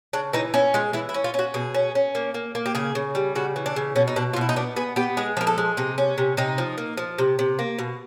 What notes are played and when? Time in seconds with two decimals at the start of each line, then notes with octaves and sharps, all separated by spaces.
0.13 C#3 D4
0.33 E3 D#4
0.54 C#4 E4
0.74 G#3 F4
0.93 E3 E4
1.09 E4
1.14 C#4
1.24 F4
1.34 C#4 F#4
1.54 B2 G#4
1.74 C#4
1.95 C#4
2.15 A#3
2.34 A#3
2.55 A#3
2.66 G4
2.75 C#3 G#4
2.95 C#3
3.15 G3
3.35 C#3 F#4
3.56 E3
3.66 D4
3.76 C#3
3.96 B2 C#4
4.08 D#4
4.16 B2 D4
4.33 F4
4.36 B2 E4
4.49 D#4
4.56 B3 D4
4.76 B3 G#4
4.96 B3 G4
5.17 G#3 G#4
5.37 F3 A#4
5.47 A4
5.58 G#3
5.77 C3 D#4
5.98 C#4
6.18 C3
6.37 C3 D#4
6.58 F3
6.78 A#3
6.97 F3
7.18 C3
7.39 C3
7.59 A#3
7.79 B2